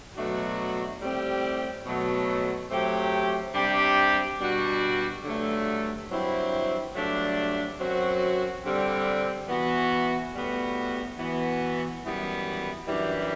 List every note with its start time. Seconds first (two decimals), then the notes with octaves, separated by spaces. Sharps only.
0.16 B2 F#3 A3 D4 F#4
1.01 A2 G3 C4 G4
1.86 B2 F#3 A3
2.70 F#3 A3 C4 G4
3.55 C3 G3 D4 G4
4.40 B2 G3 D4 F#4
5.25 G2 D3 F#3 A3
6.10 G2 F#3 C4 E4 G4
6.95 G2 F#3 A3 D4
7.80 F#2 F#3 C4 F#4
8.64 D3 G3 C4
9.48 E3 B3 F#4
10.34 A2 G3 B3 F#4
11.19 E3 B3 F#4
12.04 F#2 E3 G3 B3
12.88 F#2 E3 G3 D4 G4